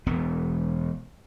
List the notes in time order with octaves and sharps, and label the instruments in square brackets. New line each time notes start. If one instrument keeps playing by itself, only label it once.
[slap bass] E1 B3